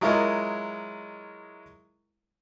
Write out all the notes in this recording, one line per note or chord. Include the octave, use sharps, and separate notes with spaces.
F#3 G#3 E4 F4 A#4 D#5